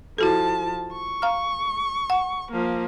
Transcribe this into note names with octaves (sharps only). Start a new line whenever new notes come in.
F3 E4 F#4 A4 A5
C#6
F5 A#5 F6
F#5
F3 A#3